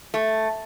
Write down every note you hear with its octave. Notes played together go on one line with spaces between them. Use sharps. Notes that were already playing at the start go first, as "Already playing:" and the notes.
A3